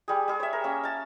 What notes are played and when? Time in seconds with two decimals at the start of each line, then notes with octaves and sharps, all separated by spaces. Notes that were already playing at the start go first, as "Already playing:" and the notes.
0.08 G3 G#4
0.28 G3 G#4
0.40 C#5 E5
0.53 A#4
0.64 A#3 C#4
0.84 F5 A5